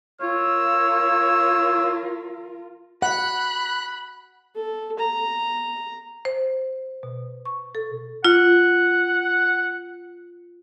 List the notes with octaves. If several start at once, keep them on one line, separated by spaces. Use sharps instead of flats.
F4 A#4 C#5 E6
F#5 B5 F#6
A4
A#5
C5
B2
C#6
A4
F4 F#5